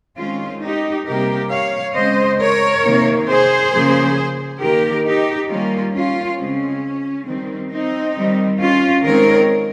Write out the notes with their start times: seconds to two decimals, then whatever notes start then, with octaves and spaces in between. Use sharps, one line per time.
0.17 D#3 G#3 C4 C#4 F4
0.62 D#4 G4
1.06 C3 G3 A#3 G4 A#4
1.50 C#5 F5
1.94 C#3 G#3 C4 C5 D#5
2.39 A#4 C#5
2.84 C3 D#3 A#3
3.28 G#4 C5
3.72 C#3 F3 A#3
4.60 D#3 A#3 G4 A#4
5.05 D#4 G4
5.49 D#3 G3 A#3 C#4 F4
5.93 C#4 F4
6.38 C#3 G#3 C4 C#4
7.26 D#3 G3 C4
7.71 C4 D#4
8.15 D#3 G3 C4
8.60 C#4 F4
9.04 D#3 G#3 C4 A#4 C#5